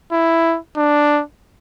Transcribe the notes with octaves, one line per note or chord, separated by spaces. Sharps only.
E4
D4